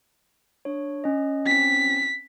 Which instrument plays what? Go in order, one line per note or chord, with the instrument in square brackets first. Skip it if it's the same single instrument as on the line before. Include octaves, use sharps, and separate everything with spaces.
[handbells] D4 C#5
C#4 D#5
[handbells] C4 C#4 [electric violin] B6